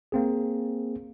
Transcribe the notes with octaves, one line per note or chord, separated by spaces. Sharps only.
A#3 C4 G#4